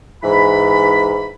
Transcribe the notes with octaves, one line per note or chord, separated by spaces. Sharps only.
G#2 E3 B5